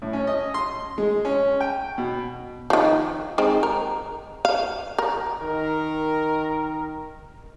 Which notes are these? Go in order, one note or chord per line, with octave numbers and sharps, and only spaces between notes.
A2
C#4
D#5
C6
G#3
C#4
G5
B2
D#3 F3
D#3 G#3 C4
A#4
F5
A#4
D#3 A#4